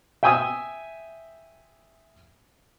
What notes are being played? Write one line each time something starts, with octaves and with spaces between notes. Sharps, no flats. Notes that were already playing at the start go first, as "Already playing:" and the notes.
E5 G5 G#5 D#6 E6